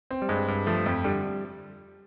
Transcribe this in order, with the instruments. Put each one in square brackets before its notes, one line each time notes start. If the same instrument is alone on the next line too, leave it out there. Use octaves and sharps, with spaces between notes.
[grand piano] C4
[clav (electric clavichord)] G3
[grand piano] G2 [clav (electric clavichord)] G#3
[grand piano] G2
[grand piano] F3 [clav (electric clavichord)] A3
[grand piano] F2
[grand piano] D3 [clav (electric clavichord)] G3